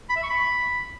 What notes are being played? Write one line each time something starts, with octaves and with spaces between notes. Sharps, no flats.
B5
E5
C#6
B5